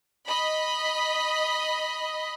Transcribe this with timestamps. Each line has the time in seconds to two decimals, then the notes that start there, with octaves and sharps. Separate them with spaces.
0.27 D#5 B5